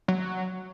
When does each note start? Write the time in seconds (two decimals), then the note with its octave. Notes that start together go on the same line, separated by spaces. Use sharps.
0.08 F#3